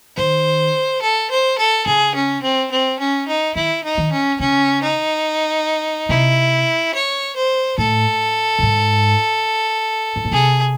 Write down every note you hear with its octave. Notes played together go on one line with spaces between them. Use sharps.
D#3 C5
A4
C5
A4
C#3 G#4
C#4
C4
C4
C#4
D#4
D#3 E4
D#4
D#3
C#4
C#3 C#4
D#4
C3 E4
C#5
C5
A2 A4
A2
G#2
G#2
A2
C3 G#4